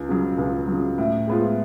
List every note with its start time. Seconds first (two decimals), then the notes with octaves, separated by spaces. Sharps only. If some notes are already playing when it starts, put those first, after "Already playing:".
Already playing: C#2
0.09 C#3 F#3
0.38 C#2
0.68 C#3 F#3
0.98 A2
1.27 G#3 B3 F4